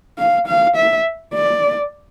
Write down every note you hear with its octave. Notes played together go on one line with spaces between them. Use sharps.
F5
F5
E5
D5